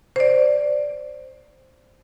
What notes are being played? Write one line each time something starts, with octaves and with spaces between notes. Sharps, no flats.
C5 D5